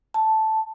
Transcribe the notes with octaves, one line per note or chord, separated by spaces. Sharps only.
A5